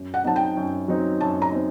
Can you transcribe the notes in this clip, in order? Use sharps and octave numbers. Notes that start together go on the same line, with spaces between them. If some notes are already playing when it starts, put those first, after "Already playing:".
Already playing: F#2
F#5
F#3 C4 D#4 A5
G5
F#2
F#3 C4 D#4
F#2 A5
A#5
C4 D#4